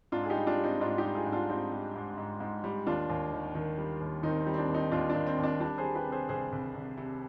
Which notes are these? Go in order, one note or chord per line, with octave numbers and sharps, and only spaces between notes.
G#2 D4 F4
G#4
D#4 G4
G3
D4 F4
G3
C4 D#4
G#2 D4 F4
D#4 G4
G3
F4 G#4
G#2
D4 F4
G3 C4 D#4
G3
G#2
G#2
G#2
G3
D#2 D4 F4
D#2
D#3
D#3
G3
D#2
D#3 C4 D#4
C4
G3
C4
D4
D#2
C4 D#4
D#2 D4 F4
D#2 D4
C4
D#2
D4
G3 D4
G#4 C5
G3
G4 B4
C3
G#4 C5
C2 G#4 C5
C2
C2
C3